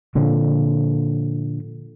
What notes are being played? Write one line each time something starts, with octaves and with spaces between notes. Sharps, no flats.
A#2 D3 F3